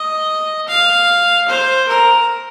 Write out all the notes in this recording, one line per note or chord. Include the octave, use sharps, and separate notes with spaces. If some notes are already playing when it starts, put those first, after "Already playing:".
Already playing: D#5
F5
C5
A#4